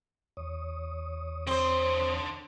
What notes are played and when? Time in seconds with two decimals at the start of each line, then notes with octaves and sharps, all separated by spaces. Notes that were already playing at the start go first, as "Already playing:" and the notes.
0.37 E2 C#5 D#6
1.47 D3 C4 C5 C6